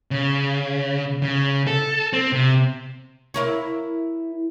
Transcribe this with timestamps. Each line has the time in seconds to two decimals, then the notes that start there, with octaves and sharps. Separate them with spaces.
0.11 C#3
1.23 C#3
1.67 A4
2.13 C4
2.32 C3
3.34 E4 A#4 C#5